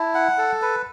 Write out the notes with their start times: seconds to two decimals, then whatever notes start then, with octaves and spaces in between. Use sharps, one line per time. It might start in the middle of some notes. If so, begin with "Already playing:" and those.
Already playing: E4 A5
0.15 F#5
0.38 A4
0.62 B4